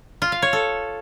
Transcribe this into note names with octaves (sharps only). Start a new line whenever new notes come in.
F4
F5
C#5
A4